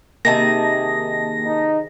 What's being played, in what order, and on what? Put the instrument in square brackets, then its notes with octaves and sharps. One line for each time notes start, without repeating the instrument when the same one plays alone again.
[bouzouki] C3 D#3 G#4 [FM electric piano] A#3 A5 [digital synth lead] A#6
[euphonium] D#4